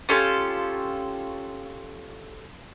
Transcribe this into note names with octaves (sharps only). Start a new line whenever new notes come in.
C#4 F4 G4 A4